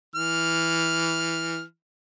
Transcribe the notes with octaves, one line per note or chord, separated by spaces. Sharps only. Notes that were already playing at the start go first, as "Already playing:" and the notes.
E3 F6